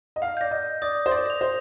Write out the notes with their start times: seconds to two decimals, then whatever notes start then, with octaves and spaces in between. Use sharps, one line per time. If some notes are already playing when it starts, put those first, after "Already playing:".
0.16 D#5
0.22 F5
0.37 D5 G6 A#6
0.51 D#5
0.82 D5 D#6
1.06 C5
1.11 D5
1.26 A#6 F7
1.41 C5